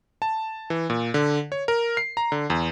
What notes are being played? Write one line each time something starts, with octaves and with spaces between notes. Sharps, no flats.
A5
E3
A#2
D3
C#5
A#4
C7
A#5
D3
E2